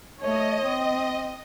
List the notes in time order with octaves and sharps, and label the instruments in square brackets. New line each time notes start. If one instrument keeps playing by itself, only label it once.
[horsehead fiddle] A3 C#5 [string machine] D#5
[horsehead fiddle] C4